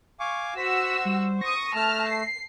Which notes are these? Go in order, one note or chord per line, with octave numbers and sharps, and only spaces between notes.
F5 G#5 C#6 D6
F#4 C5 E6 B6
G3
C#6 D#6 A#6
A3 A5 F6
C7